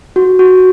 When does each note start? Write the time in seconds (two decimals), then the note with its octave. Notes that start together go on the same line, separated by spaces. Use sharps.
0.16 F#4
0.39 F#4